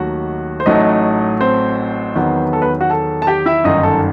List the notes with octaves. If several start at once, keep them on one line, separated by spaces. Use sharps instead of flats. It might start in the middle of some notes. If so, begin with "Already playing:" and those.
Already playing: D#2 D#3 F#3 A3 F#4 F#5
C5
A1 A2 F#3 A3 D#4 D#5
C4 C5
E2 D#3 F#3 B3
A4
B3 B4
F#4 F#5
A4 A5
A5
G4 G5
E4 E5
G1 F#2 D#3 D#4 D#5
A4